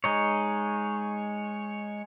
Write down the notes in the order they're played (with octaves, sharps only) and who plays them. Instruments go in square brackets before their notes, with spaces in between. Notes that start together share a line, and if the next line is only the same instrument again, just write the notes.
[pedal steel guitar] G#3 D#4 C#5